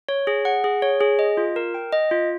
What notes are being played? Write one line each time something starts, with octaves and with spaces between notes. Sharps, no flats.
C#5
G#4
F#5
G#4
C#5
G#4
D#5
F4
A#4
G5
D#5
F4